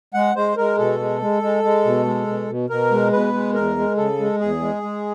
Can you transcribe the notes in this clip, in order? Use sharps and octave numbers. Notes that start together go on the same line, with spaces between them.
G#3 F#5
G#3 C5
G#3 A#4
B2 A4
G#3
G#3
G#3
G#3
B2
G#3
B2
B2
B2 A#4
G#3
B2 B4
G#3
E2 A#4
G#3
C#3 A4
G#3
E2 G#4
G#3
G#3